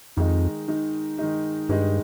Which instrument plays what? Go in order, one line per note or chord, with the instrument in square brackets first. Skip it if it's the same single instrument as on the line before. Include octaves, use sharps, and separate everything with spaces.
[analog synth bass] F2 [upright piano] D#3 G#3 D#4
[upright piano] D#3 G#3 D#4
D#3 G#3 D#4
[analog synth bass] G2 [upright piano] D#3 G#3 D#4